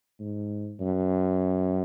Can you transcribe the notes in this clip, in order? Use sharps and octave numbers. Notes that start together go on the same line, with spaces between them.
G#2
F#2